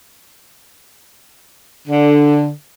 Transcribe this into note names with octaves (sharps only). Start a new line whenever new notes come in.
D3